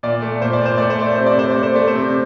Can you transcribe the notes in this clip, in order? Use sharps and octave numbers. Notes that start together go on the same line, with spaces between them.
A#2 D5
A3
A#2 C5
D5
A#2 C5
A3 D5
C5
A3 D5
C3 C5
D5
C3 C5
D5
A3
C5
A3 D5
C5
C3